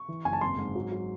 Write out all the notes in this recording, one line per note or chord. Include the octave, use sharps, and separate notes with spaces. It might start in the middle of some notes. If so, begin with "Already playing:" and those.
Already playing: C#6
E3
F#1 G#5
A5
G#1 C6
G#2
F#3
F#3